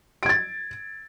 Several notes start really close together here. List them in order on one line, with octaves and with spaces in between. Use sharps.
D7 G#6 A6